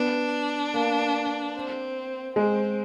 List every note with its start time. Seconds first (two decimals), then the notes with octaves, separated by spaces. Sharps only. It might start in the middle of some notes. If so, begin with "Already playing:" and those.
Already playing: B3 D4
0.74 A#3
1.55 C4
2.36 G#3 C4